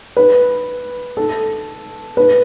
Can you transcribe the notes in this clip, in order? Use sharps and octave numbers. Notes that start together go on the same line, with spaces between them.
B4
A4
B4